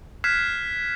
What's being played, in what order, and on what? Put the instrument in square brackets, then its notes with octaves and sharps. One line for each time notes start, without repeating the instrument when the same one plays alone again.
[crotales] F6 F#6 G#6 B6 C7 E7